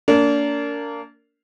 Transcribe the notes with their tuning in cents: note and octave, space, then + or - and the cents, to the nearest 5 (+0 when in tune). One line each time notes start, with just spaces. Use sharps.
A#3 -20 D4 -30